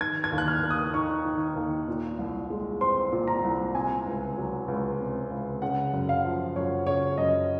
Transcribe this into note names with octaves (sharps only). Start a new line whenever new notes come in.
D#3 G#6
G#6
D#2
F#6
F6
A#3
D#6
D#4 C#6
D#3
D#2
A#2
C2
G#3
C4 C6
A#2
A#5
C2
C3 G#5
C#2
F#3
C#2
C3
C#2
C#3 F#5
F#2
F5
F3
F#2 C#5
C#3 C#5
F#2 D#5